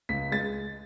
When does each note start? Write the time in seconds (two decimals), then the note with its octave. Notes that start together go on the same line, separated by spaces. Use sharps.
0.09 C#2 B6
0.32 G#3 A6